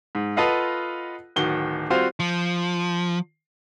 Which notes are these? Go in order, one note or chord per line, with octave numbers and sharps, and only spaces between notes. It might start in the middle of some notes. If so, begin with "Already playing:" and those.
G#2
F4 A4 B4 D#5 F5 F#5
D1 D#3 F#4 G7
G3 C4 F4 F#4 C5 F5
F3